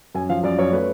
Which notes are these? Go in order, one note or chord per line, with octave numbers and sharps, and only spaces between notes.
F#2 G#5
F3 F5
F#2 D5
F#2 C#5
A3 B4